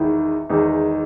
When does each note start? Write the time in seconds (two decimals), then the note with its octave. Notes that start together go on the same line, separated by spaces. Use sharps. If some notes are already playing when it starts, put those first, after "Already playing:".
Already playing: E2 D#3 G#3 D#4 E4
0.50 E2 D#3 G#3 D#4